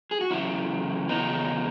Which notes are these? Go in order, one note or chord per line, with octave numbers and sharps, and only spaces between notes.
G#4
F#4
F#2 C#3 E3 C#4 E4
E2 C#3 E3 B3 D#4